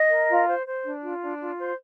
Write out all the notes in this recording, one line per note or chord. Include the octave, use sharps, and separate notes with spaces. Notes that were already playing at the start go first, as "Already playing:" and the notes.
Already playing: D#5
A#4
F4
C5
C5
D4
F4
D4
F4
C5